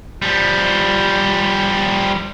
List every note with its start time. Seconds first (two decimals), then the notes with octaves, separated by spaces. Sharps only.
0.22 F3 G3